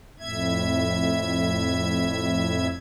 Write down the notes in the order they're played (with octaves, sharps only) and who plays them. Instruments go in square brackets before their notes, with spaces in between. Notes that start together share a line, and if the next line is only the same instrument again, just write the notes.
[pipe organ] F2 A2 E5 G#6